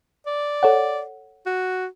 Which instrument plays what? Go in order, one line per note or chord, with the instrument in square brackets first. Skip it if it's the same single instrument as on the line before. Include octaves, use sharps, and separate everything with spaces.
[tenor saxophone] D5
[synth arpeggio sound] A4 C#5 F#5
[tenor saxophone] F#4